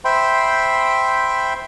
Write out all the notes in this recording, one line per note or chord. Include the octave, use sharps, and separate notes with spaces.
C5 E5 G5 B5 C6